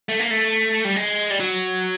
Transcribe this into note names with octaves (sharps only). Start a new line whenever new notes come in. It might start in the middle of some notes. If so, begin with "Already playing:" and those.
A3
A#3
A3
G3
G#3
G3
F#3